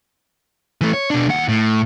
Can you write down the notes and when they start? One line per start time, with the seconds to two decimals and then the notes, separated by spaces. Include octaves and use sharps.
0.81 E3 A3
0.93 C#5
1.10 B2 D4
1.28 D#2 F#5
1.49 A2